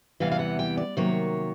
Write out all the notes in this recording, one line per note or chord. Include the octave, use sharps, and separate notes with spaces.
E2 C3 E3 G3 B3 F5
F5
F#5
G5
D5
C3 D#3 F#3 A#3 C#5